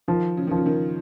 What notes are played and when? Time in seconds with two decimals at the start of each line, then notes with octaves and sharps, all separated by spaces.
0.08 D#3 F3
0.37 C#3
0.47 D#3 F3
0.57 C#3
0.66 D#3